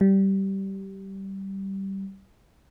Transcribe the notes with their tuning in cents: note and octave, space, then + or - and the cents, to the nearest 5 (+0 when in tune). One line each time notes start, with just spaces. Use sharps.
G3 -15